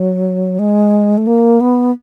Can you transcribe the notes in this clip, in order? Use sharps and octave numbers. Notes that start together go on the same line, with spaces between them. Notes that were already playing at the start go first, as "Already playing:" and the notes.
Already playing: F#3
G#3
A3
A#3
B3